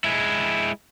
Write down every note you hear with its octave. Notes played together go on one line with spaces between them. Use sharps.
G#3 E4